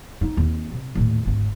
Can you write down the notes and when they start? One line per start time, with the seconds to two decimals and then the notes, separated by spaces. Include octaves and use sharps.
0.21 A#3 D#4
0.37 D#2 C4
0.72 C3
0.95 D#2 A2
1.25 G#1 D2